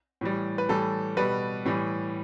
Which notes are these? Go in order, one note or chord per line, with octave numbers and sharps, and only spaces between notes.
A2 E3 G3
B4
A2 E3 G3 A4
B2 G3 B4
A2 E3 G3